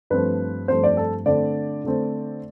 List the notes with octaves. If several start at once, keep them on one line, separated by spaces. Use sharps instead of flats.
G2 F3 A3 C4 B4
G2 F3 A3 C4 C5
D5
A4
D3 A3 C4 D5
D3 A3 C4